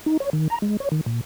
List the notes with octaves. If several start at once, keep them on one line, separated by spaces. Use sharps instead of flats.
D#4
C#5
D#3
A#5
G#3
C#5
D#3
A#2